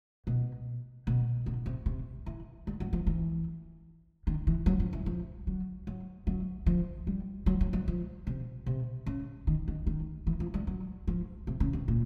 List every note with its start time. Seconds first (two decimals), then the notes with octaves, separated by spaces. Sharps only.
0.27 B2
1.07 B2
1.46 B2
1.66 C3
1.86 C3
2.26 E3
2.67 G3
2.80 F#3
2.93 F3
3.07 E3
4.27 D#3
4.47 E3
4.66 F#3
4.80 F3
4.93 E3
5.06 F3
5.47 F#3
5.87 F#3
6.27 F#3
6.66 F3
7.07 G3
7.46 F#3
7.61 F#3
7.73 F#3
7.88 F3
8.27 C3
8.66 C3
9.06 C#3
9.47 D#3
9.68 D#3
9.87 D#3
10.27 E3
10.40 F3
10.54 G3
10.67 F#3
11.07 F3
11.47 C3
11.60 C#3
11.73 C3
11.88 A#2